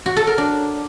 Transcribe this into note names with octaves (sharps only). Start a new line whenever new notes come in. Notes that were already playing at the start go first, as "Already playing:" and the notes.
F#4
A4
A#4
D4